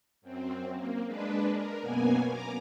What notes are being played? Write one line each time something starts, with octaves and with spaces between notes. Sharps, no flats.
F#2 C4
A#3
G#3 D4 B4
A#4
F#2 B2 A#3 B3 G#5
A#5 D6